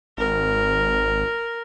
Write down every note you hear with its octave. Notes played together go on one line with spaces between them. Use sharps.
G#1 A#4